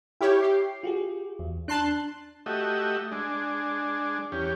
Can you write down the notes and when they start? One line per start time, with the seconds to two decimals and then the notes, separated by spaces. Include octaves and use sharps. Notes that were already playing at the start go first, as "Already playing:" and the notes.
0.21 E4 G4 C#5 G5 F6
0.42 G4 C7
0.83 F4 F#4 G#4
1.39 E2
1.68 D4 A5 C6 F#6
2.46 A3 F#4 G4 D#5 E5
3.12 G#3 D4
4.32 E2 C#4 G4